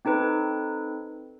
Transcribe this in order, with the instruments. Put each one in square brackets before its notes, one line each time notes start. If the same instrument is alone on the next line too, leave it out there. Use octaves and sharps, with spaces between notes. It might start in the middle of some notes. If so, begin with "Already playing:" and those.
[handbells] C4 D#4 A4 B4